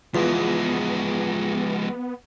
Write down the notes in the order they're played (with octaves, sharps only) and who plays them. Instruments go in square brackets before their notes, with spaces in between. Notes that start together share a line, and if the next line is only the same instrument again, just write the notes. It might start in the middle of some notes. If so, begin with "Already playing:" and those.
[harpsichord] E2 [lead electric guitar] F3 G#3 [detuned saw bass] B3 [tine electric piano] F4